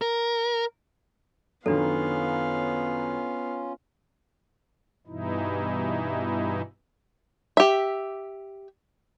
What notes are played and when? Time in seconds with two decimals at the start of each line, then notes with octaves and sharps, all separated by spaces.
0.02 A#4
1.66 F#2 D#3 B3 C#4 D4 F4 A4 F5
5.07 G2 B2 E3 D#4 E4
7.57 G4 E5